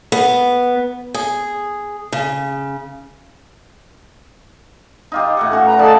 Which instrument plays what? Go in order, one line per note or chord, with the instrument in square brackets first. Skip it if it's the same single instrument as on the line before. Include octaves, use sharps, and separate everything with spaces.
[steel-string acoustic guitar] B3
G#4
C#3
[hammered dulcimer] D#4 F4 G4
A2 E5 F#5
C#4 F#4 F#5
[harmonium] B4 A#5
[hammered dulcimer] C#3 F3 D#4 [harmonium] A4 D5 A5